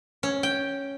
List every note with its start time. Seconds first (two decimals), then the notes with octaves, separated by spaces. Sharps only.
0.23 C#4
0.43 G5